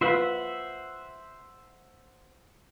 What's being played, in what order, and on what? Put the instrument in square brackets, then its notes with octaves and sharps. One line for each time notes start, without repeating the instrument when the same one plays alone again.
[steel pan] F4 B4 [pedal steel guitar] C5 E5 F#5